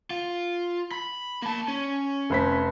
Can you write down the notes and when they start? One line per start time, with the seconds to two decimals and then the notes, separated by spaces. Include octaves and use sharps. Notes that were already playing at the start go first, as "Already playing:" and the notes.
0.11 F4
0.91 B5
1.42 A#3 A5
1.68 C#4
2.30 F1 C5 B6